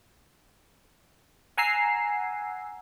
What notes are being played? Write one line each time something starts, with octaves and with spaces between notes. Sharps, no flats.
F#5 G#5 A#5 E6 C7